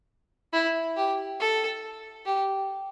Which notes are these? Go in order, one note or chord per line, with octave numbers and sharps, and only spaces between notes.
E4
G4
A4
G4